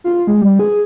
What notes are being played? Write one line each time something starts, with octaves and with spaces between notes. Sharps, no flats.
F4
G#3
G3
G#4